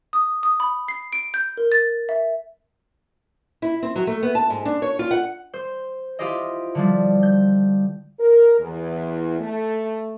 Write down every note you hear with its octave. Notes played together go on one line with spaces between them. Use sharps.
D#6
D#6
B5
C7
D7
G6
A#4
A6
E5
E4
C4
F#3
A3
B3
A5
G#2
D4
C#5
F4
F#5
C5
E4 F4 G4 C5 D#5
D3 F3 G3
G6
A#4
E2
A3